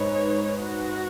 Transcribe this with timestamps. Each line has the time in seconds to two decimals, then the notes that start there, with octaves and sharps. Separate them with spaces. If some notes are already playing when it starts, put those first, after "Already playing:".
Already playing: G#2 G#3 D#4 B4 C#5
0.61 F#4